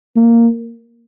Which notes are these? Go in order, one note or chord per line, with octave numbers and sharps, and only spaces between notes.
A#3